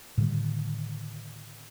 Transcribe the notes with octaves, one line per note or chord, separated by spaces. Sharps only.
A2 D3 D#3 G3